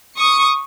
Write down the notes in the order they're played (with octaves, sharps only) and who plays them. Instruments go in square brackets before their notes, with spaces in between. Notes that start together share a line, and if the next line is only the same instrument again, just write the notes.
[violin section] C#6 D#6